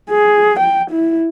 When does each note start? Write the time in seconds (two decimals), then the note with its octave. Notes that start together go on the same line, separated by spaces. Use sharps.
0.10 G#4
0.59 G5
0.91 E4